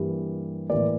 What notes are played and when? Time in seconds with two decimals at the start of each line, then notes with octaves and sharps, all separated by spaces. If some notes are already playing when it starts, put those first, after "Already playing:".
Already playing: G2 E3 G3 A#3
0.70 A2 E3 A#3 D5